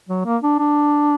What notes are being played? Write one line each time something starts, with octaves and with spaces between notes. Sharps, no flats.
F#3
A#3
D4
D4